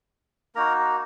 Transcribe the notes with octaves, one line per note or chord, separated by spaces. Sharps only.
A#3 D#4 F#4 A#4 A#5